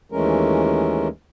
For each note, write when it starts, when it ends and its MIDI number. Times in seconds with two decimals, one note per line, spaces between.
0.12 1.08 39
0.12 1.08 52
0.12 1.08 56
0.12 1.08 57
0.12 1.08 61
0.12 1.08 70